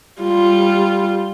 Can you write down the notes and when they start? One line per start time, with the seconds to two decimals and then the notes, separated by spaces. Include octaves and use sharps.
0.22 G3 F4